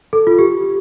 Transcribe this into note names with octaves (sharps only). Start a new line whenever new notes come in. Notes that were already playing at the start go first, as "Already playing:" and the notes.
A4
F4
G4